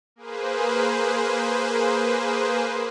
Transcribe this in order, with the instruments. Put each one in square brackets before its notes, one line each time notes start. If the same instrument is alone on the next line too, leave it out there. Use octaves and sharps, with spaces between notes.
[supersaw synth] A#3 G#4 B4 C5